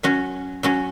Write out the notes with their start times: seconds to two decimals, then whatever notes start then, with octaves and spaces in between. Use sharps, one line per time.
0.03 F#3 C#4 F#4
0.63 F#3 C#4 F#4